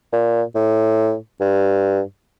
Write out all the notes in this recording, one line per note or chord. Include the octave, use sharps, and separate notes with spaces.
A#2
A2
G2